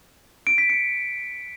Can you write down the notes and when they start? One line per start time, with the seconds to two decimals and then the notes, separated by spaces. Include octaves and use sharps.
0.47 D7
0.58 B6
0.70 C#7